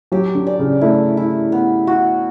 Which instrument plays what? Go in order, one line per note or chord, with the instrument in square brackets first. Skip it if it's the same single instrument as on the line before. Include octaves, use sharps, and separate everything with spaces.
[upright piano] F#3 [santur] G4
[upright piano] D3
[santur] D5
[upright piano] C#3
[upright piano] A3 [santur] E4
[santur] E4
B3
F#4